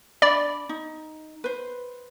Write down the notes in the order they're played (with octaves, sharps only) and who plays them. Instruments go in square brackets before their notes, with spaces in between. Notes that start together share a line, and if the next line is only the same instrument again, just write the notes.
[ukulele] D4 B5 [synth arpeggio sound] D5
[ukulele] D#4
B4 C5